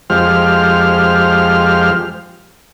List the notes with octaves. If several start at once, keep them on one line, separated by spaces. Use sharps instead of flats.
F2 F3 G#3 G4 C5 F6